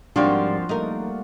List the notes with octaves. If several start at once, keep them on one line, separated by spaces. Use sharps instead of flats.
G#2 F3 G3 A#3 C4 D4 F4 F#4
G3 A3 A#3 D#4 A#4